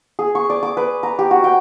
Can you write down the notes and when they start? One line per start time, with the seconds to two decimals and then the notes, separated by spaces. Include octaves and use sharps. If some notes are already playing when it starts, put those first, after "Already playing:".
0.19 G#4
0.35 C#6
0.50 D5
0.63 D6
0.77 B4
1.03 A#5
1.19 G4
1.31 F#4
1.44 G5